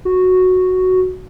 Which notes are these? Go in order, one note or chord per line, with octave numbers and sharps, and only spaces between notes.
F#4